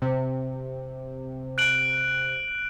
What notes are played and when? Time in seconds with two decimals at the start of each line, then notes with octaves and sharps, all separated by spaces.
0.02 C3
1.58 F#6 D7 F#7